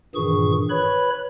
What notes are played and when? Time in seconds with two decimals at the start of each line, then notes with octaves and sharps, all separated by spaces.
0.15 G2 A#2 D#3 E3 G#4 C#6
0.70 B4 C#5 B5